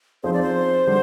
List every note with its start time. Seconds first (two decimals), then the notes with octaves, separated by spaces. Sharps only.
0.23 F3 C4 D#4 G#4 C5
0.33 D5
0.42 C5
0.87 D3 G3